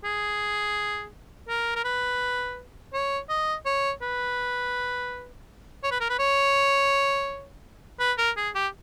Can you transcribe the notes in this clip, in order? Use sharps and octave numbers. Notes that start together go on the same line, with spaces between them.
G#4
A#4
A#4
B4
C#5
D#5
C#5
B4
C#5
B4
A#4
B4
C#5
B4
A#4
G#4
G4